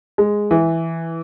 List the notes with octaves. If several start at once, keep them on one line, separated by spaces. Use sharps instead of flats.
G#3
E3